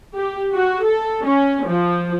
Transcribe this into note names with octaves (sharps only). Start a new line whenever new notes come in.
G4
F#4
A4
C#4
F3